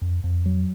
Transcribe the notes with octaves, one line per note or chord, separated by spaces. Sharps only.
F2
F2
F#3